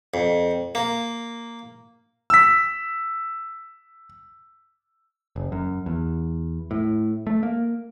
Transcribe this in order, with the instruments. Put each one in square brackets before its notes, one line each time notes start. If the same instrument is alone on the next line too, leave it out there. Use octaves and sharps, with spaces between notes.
[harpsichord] F2
A#3
[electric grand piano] E6 B6
[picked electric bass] F#1
F#2
E2
A2
A3
A#3